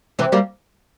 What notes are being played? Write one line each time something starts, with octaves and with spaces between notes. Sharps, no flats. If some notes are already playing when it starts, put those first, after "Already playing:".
C3 E3
G3 A#3